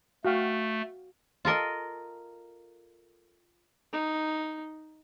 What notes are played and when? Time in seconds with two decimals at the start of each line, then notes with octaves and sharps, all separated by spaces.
0.25 A3 F#4 F5 G5
1.45 F4 A4 A#4 D#5
3.93 D#4